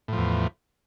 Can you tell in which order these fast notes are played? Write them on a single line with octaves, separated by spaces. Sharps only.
A2 F3 E2